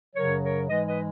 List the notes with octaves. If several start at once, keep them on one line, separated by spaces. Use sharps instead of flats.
F#2 C#3 F#3 A#4 C#5
A#4 C#5
G#2 E3 G#3 B4 D#5
B4 D#5